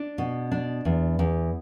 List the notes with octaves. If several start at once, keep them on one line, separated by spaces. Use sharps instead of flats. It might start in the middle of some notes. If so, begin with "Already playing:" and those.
Already playing: D4
B2
D4
E2
E2